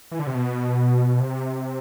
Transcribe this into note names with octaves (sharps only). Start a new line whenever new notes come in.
E3
D3
C3
B2
C3